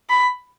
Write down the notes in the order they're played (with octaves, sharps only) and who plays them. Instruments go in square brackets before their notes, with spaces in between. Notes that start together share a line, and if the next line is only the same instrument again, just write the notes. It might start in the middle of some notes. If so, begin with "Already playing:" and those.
[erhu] B5